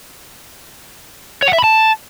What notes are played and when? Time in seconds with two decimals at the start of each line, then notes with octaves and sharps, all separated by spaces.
1.42 C#5
1.48 F#5
1.53 E5
1.58 B5
1.64 A5